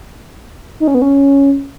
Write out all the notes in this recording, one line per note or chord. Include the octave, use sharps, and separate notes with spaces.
D#4
C#4
B3
C#4